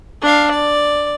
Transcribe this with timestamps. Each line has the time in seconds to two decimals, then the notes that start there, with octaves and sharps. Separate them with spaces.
0.22 D4 F5
0.51 D5